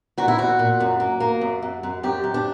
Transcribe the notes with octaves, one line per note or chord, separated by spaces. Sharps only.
A#2 F#4
E4
A#2 F#4
A#2
F#2
A#3
A#3
F#2
F#2
F#2
F#2 G4
F#2
D4